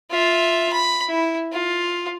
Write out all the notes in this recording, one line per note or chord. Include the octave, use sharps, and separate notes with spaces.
F4 E5
B5
E4
F4